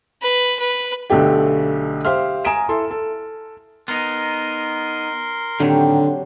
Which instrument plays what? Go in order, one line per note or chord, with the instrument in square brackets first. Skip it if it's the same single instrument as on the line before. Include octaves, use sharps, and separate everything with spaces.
[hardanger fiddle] B4
B4
[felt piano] B1 D3 A3 G4 G5
G4 C5 E5 F5 C6 F6
G#5 A#5 D#6 D7 E7
E4 A4 C6
A4
[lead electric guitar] B3 D#4 [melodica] A#4 C6
[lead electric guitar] A2 D#3 [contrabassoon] D3 [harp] F#3 C4 G4